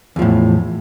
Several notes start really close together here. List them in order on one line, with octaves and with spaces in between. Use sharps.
E2 F3 A2